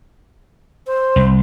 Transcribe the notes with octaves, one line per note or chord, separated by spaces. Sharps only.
C5
C2